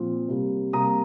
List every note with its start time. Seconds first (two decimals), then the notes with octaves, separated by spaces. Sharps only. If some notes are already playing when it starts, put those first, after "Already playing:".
Already playing: A#2 F3 C4
0.28 C3 G3 A#3
0.73 C3 G3 A#3 A#5 D#6